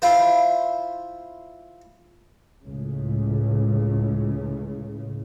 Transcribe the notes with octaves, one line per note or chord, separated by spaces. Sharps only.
E4 F4 C5
C#2 A2 C#3